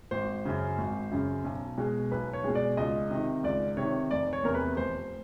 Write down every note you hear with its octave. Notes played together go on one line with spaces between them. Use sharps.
G#1 C5
F#2 C#3
G#1
F#2 C#3
B1
B2 G#3
B1 B4
C#5
B2 G#3
D5
C#2 D#5
C3 D#3
C#2 D5
C3 D#3 C#5
F1 D5
C#5
E2 C3 A#4
B4
F1 C5